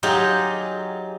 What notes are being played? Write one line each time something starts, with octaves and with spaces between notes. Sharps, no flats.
F#3 D#4 F4 G4 G#4